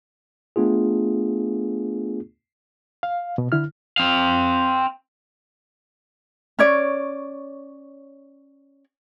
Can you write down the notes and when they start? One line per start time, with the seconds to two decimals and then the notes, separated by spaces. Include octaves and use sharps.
0.56 A3 B3 D4 F4 G#4
3.03 F5
3.38 B2
3.52 D3 E4 F6
3.98 C4 F5
6.59 C#4 C#5 D5